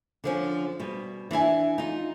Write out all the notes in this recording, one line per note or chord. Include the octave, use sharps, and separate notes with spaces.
D3 F3 C#4
B2 G3
E3 D4 E4 G#5
D#4 F4